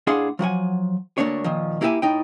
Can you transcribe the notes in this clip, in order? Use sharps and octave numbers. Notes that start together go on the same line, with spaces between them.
A2 D4 G#4 F5 F#5 C6
F3 F#3 F#5 G#5
D2 C3 A3 A#3 D4 C#5
A#2 D#3 F3
A#3 E4 G4 D5 E5 G#5
A2 D#4 G5